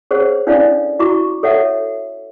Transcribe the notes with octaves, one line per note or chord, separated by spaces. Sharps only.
G#4 C5 C#5 F#5
C#4 D4 E4 A4 D5 F5
E4 F#4 A#5 C#6 D6
A4 C#5 E5 F#5